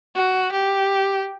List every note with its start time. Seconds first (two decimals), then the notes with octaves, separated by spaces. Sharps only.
0.16 F#4
0.52 G4